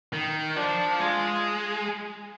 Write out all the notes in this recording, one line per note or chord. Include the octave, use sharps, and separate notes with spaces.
D#3
F3 D4
G#3 F4